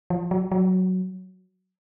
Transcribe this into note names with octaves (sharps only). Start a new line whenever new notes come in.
F3
F#3
F#3